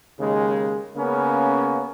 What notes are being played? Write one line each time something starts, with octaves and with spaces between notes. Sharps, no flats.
D#2 C#3 G#3
C#3 A#3 B3 C#4